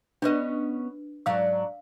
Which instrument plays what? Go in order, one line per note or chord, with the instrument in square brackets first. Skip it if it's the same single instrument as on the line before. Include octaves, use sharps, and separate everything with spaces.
[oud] B3 C#4 D#5 [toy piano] D4 B4
[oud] G#2 F#3 D4 [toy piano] F5 E6